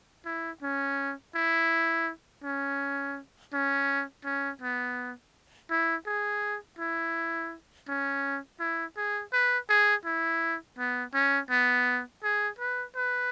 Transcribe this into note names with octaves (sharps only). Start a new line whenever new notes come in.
E4
C#4
E4
C#4
C#4
C#4
B3
E4
G#4
E4
C#4
E4
G#4
B4
G#4
E4
B3
C#4
B3
G#4
B4
B4